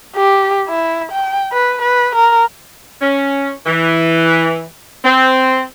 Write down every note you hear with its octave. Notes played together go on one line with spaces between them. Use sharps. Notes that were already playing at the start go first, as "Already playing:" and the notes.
G4
E4
G5
B4
B4
A#4
C#4
E3
C4